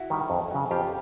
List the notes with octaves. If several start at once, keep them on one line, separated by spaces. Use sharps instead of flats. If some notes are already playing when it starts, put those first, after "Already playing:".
Already playing: E4 F#4
D#3 G3
F2
C#3 F#3
F2 F4 G4